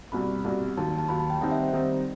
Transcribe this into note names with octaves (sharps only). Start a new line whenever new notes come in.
C2 B2 G3 B5
C2 B2 G3
D#2 D#3 F#3 A5
A5
D#2 D#3 F#3 B5
A5
G5
D#3 G3 C4 D#4 F#5
E5
C5
D#3 G3 C4 D#4